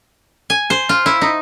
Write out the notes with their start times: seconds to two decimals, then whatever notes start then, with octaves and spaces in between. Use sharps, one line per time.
0.50 G#5
0.70 C5
0.89 F4
1.06 E4
1.21 D#4